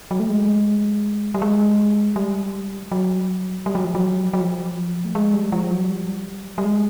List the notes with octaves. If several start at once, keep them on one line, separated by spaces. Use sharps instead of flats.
F#3
A3
G#3
G3
G#3
G3
F#3
G3
F#3
F3
F#3
F#3
F3
A3
G#3
G3
F3
F#3
G3
G3
G#3